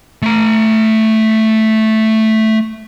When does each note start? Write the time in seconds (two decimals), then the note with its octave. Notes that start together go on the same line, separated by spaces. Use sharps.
0.22 A3 A#5